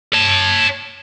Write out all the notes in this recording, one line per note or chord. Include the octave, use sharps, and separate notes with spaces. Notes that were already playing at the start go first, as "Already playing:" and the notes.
C#5 A5